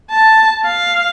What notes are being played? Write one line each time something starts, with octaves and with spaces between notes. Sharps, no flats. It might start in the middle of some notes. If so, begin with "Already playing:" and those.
A5
F5